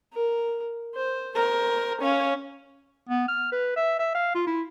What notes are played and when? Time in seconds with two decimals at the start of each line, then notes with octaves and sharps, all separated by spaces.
0.13 A#4
0.95 C5
1.36 A#4 C5
2.02 C#4 C#5 F5
3.09 B3
3.28 F6
3.52 B4
3.76 E5
3.99 E5
4.15 F5
4.35 F4
4.47 E4